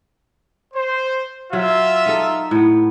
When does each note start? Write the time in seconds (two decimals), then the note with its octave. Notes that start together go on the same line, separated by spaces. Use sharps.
0.74 C5
1.53 F#3 F4 E5
2.06 D#4 A4
2.51 A2 B3